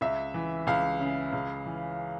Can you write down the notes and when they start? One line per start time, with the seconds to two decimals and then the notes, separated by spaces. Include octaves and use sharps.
0.01 C#2 E5
0.34 E3
0.67 C#2 F5
1.00 C#3
1.33 C#2
1.66 E3